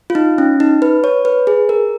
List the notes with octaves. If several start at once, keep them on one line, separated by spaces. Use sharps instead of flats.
F4
D#4
C#4
D#4
B4
C#5
B4
G#4
A#4